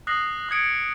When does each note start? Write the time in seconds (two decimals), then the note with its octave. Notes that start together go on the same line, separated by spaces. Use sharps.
0.07 D#6 F#6 A#6 C7 F#7
0.49 D#6 F#6 G#6 C#7 D7